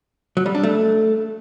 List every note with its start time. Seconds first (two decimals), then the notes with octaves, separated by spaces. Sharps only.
0.37 F#3
0.46 G3
0.55 D4
0.63 A3